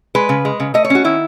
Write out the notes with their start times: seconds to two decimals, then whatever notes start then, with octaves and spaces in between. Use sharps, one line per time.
0.15 G#3 B4
0.29 C#3
0.45 G#3
0.60 C#3
0.74 A3 D#5
0.85 C#5
0.90 C#4 F#4
1.04 D#3 E4